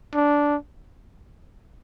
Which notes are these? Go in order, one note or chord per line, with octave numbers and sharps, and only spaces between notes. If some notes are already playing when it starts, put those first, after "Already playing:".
D4